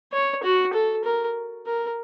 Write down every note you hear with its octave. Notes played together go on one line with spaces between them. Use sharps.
C#5
F#4
A4
A#4
A#4